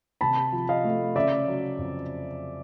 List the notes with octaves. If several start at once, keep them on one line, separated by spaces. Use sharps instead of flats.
C3 A5 B5
F3
D#5 F5
A3
C#3 D5 E5
F#3
F2